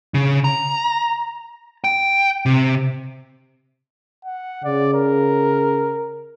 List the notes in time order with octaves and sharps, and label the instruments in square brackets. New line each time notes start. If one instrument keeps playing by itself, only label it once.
[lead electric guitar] C#3
A#5
G5
C3
[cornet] F#5
[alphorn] C#3 [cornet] D5
[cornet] A#4